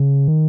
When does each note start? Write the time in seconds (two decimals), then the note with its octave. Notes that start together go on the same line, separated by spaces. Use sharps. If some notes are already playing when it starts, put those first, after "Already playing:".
Already playing: C#3
0.28 D#3